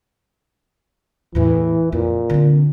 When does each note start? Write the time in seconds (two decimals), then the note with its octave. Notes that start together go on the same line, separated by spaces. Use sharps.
1.35 E2 A2 E3
1.92 F2 A#2
2.30 D3 C4